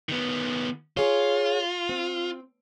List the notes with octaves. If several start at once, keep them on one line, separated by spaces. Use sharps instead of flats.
D#3 B3
F4 G#4 C#5
C4